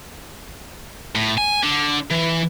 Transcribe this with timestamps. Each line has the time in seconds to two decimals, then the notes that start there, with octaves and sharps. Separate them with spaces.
1.15 A2
1.38 G#5
1.63 D3
2.10 E3